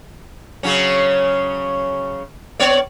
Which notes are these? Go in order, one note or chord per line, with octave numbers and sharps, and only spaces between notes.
C#3 F#3 C#4
B3 C#5 D5